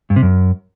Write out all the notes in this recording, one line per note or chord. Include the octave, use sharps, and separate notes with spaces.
G2
C3
F#2